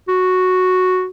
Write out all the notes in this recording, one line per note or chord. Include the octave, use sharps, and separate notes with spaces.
F#4